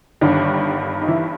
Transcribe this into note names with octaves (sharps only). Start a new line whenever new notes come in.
G1 G2 D3 D#3 D4
D#4
E3 E4